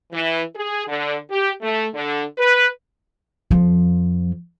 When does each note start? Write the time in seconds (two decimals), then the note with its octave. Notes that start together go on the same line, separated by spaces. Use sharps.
0.12 E3
0.55 G#4
0.87 D3
1.30 G4
1.62 A3
1.94 D3
2.38 B4
3.51 F2 F3